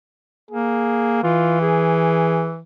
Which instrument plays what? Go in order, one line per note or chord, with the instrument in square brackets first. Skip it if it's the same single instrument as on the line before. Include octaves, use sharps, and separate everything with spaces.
[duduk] A#3 [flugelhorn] G#4
[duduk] E3 [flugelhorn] F4
[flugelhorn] G#4